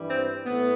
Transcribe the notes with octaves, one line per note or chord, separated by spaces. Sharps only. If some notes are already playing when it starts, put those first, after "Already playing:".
Already playing: G2 E3 G3
C4
A2 B3